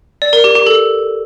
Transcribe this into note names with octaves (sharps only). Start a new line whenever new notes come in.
D5
A#4
G4
G4
A4